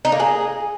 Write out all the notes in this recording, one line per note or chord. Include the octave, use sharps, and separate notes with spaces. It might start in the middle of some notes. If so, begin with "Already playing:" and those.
D#4
A#3
G#4